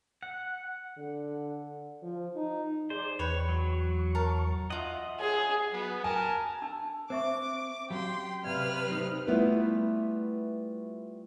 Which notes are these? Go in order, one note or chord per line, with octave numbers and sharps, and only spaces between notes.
F#5
D3
F3
D#4
G#4 C5 D5
E2 B4 C#5 G5 C#6
F#3
A#4 A5
F4 D#5 E5 F#5 D#6
G#4
F#3 B3
A#4 G#5 A5
D4 A5 E6
C4 C5 E5 C#6 D6
F#3 C#4 G4 F5 G5 B5 C6
C3 B4 D5 F5 F6
D#4 G4 C5
G3 A3 B3 E4 F4 B4